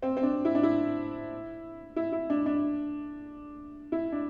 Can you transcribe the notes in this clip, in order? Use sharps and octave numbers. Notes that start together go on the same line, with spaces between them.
C4
C4
D4
E4
D4
E4
E4
E4
D4
D4
E4
D4